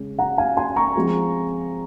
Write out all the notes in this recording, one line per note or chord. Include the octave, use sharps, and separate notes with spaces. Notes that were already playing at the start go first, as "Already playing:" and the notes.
Already playing: C#3 G#3 C#4
F#5 A#5
F5 G#5
G#5 C6
A#5 C#6
F3 G#3 C4